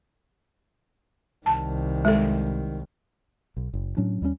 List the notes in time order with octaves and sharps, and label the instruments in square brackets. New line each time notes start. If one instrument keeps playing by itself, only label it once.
[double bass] C2 D#3 [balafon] A5
[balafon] G#3 A4
[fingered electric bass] B1
F#1
A2 F#3 C#4 D4
D#2 G3 A3 C#4